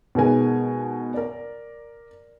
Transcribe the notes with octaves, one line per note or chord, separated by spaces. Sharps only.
B2 D#3 G#3 B3 A#4 G#5
A#4 D5